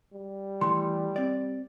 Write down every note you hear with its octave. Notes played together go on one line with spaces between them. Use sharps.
G3
E3 A3 C6
C4 D5